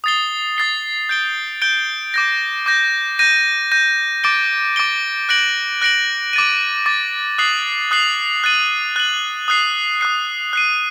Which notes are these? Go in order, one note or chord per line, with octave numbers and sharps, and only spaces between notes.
D#6 A6 C7 G7
D#6 A6 C7 G7
G6 D7 G7
G6 D7 G7
D6 G6 A#6
D6 G6 A#6
G6 A#6 D#7
G6 A#6 D#7
D6 A6 D7 G7
D6 A6 D7 G7
F#6 A#6 D7 F#7
F#6 A#6 D7 F#7
D6 A6 D#7
D6 A6 D#7
D#6 F#6 C7 F#7
D#6 F#6 C7 F#7
F#6 A6 D#7 F#7
F#6 A6 D#7 F#7
D#6 F#6 C7
D#6 F#6 C7
F#6 C7 D#7